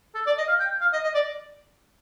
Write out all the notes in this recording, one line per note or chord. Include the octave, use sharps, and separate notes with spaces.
A4
D5
D#5
F5
G5
F5
D#5
D#5
D5